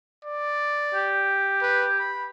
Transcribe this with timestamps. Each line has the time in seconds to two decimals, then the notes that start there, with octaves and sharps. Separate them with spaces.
0.25 D5
0.95 G4
1.62 B4
1.99 B5